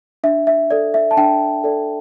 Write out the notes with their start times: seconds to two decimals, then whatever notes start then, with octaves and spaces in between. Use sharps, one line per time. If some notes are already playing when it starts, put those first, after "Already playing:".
0.24 D4 E5
0.47 E5
0.71 A4 D5
0.94 E5
1.11 A5
1.17 D4 G5
1.64 A4 D5